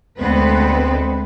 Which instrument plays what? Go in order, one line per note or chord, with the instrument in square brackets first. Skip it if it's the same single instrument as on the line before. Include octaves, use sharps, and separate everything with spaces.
[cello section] D2 G#3 B3 C4 B4